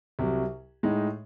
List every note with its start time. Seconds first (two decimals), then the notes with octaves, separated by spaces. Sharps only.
0.19 C2 C3 F#3
0.83 A2 G#3 D#4